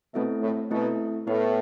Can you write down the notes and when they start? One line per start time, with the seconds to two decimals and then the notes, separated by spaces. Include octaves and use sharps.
0.14 B2 A3 C4 E4 A4 E5
0.42 A2
0.71 B2 A3 C4 E4 A4 E5
1.27 A2 B3 E4 B4